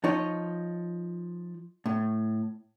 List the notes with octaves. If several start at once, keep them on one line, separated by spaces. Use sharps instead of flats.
F3 D#4 C#5
A2